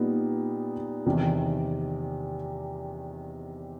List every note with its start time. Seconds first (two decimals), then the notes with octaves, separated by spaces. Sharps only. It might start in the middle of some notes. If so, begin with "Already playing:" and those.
Already playing: A#2 G3 B3 D#4
1.06 E2 C3 D#3